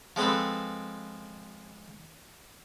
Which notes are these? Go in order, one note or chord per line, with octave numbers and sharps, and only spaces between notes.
F3 G#3 C4 A4 B4